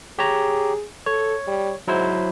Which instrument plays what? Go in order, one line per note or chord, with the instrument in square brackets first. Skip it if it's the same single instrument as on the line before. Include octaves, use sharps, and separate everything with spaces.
[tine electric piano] G4 C#5 A#5 [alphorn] G#4
[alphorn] A4 [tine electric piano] C#5
[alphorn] G3
[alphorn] G#2 [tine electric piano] F#3 E4 C5